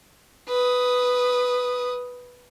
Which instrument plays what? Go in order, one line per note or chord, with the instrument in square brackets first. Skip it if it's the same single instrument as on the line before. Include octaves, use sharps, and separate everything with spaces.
[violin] B4 D#6